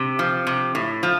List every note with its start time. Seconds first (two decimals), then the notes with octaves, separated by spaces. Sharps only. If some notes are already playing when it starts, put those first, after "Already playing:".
Already playing: C3
0.19 F3
0.47 C3
0.75 A2
1.03 F3